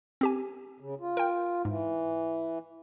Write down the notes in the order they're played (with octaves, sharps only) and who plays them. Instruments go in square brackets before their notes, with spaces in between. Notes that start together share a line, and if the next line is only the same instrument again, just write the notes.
[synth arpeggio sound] C4 G4 G#5
[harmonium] C#3
F4
[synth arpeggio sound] A#4 G5
[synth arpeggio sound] G#2 [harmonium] E3